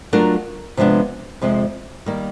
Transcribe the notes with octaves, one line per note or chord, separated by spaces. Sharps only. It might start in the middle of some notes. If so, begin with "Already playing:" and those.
F#3 A3 D4 F4 A#4
C3 F3 G#3 B3 D4
F2 C3 F3 G#3
D#3 G3 A#3